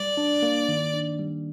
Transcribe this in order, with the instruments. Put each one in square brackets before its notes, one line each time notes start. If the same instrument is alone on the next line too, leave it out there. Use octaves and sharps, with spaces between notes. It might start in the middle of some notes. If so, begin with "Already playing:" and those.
Already playing: [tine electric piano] G3 [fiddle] D5
[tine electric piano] D4
A#3
D#3
D4
G3